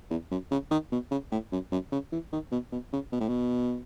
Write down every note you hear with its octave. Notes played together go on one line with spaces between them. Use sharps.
E2
F#2
C#3
D#3
B2
C#3
A2
F#2
F#2
C#3
E3
D#3
B2
B2
C#3
B2
A2
B2